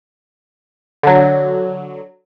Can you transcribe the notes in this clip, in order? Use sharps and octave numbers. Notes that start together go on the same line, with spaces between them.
D3 F#3